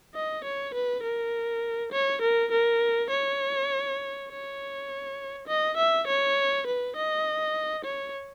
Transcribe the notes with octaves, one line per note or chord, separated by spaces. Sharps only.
D#5
C#5
B4
A#4
C#5
A#4
A#4
C#5
C#5
D#5
E5
C#5
B4
D#5
C#5